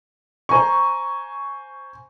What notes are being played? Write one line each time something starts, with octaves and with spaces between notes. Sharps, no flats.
C5 G#5 A#5 C#6